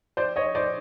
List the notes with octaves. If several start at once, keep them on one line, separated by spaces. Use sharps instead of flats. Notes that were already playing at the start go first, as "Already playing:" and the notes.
C5 D5
C#5 D#5
C5 D5